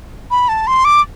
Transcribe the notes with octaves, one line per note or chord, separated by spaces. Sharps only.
B5
A5
C6
D6